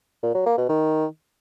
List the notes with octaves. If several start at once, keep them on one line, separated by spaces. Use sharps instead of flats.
A#2
F#3
A#3
B2
D#3